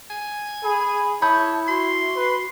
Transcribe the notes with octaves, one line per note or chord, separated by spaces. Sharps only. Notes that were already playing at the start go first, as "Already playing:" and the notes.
G#5
G#4 B5
E4 C#5 A5 B5 D#6 G6
F#4 C6
B4